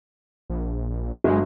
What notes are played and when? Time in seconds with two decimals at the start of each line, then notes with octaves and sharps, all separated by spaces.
0.50 A#1
1.24 G1 F#3 G#3